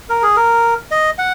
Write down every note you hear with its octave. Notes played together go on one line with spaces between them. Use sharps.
A#4
G#4
A#4
D#5
F#5